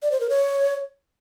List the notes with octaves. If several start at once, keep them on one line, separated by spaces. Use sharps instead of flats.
D5
C5
A#4
C#5